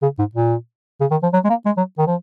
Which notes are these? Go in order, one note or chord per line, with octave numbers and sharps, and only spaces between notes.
C#3
G#2
A#2
C#3
D#3
F3
F#3
G#3
A#3
G#3
F#3
D#3
F3